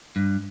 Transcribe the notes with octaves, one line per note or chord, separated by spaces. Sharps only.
G2